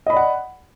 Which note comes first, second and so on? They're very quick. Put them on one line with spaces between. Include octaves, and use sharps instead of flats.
D#5 B5 D5 F#5